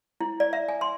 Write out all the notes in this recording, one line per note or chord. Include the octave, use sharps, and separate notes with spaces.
E4
D5
E5
G#5
C6